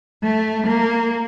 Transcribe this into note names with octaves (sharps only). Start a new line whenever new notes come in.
A3
A#3